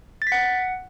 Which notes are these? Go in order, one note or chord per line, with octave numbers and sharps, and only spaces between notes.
A6
B6
F#5